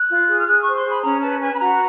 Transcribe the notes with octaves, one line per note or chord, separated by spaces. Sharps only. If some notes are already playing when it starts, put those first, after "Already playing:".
Already playing: F#6
F4
G#4
F6
G#4 F#6
C5 C#6
C6
G#4
B5
C#4 A#5
B4 A5
B4 G#5
B5
F#4 A#5